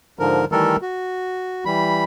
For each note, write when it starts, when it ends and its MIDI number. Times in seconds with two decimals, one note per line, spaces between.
0.19 0.45 44
0.19 0.45 50
0.19 0.45 53
0.19 0.45 70
0.52 0.76 51
0.52 0.76 52
0.52 0.76 55
0.52 0.76 57
0.52 0.76 69
0.52 0.76 70
0.82 1.64 66
1.65 2.04 52
1.65 2.04 55
1.65 2.04 83